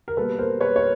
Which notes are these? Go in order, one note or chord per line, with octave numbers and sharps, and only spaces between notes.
A#4
B2 G3 A#3 A4 B4
A#4 C5
B4 C#5
C#5